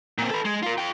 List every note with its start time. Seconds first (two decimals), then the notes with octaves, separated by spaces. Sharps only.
0.18 A#2 C4
0.31 A4 B4
0.45 G#3
0.63 F4 A#4
0.78 F4 G5